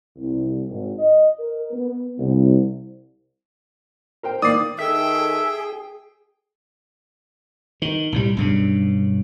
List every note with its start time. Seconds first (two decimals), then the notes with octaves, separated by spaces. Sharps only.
0.16 C2
0.69 G#1
0.99 D#5
1.39 A#4
1.72 B3
2.18 C2
4.23 A#4 C5 G5
4.42 D#3 A#3 D5 D#6 C7
4.78 D#3 G#4 A4 E5 G5
7.82 D#3
8.12 B1 A2 G3
8.37 B1 G2 C#3